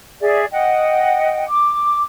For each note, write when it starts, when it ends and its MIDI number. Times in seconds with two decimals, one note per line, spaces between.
0.21 0.45 68
0.21 0.45 74
0.21 0.45 76
0.52 1.45 75
0.52 1.45 78
0.52 1.45 79
1.48 2.03 86